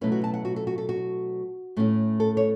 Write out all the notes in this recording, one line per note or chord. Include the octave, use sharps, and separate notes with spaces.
B2 F#3 A3 C#4 E4 B4
F#4
A5
F#5
F#4
A4
F#4
A4
F#4
A2 A3 C#4 E4
A4
C#5